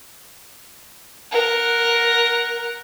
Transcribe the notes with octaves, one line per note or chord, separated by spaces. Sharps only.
A#4 F#5